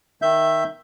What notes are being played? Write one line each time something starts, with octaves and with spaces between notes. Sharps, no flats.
D#3 E5 G6